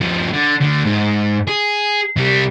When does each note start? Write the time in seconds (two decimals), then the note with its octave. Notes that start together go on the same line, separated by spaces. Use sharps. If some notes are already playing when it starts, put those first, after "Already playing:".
0.01 G2 F3
0.33 D3
0.61 D2 D3
0.86 G#2
1.47 G#4
2.17 C3 G3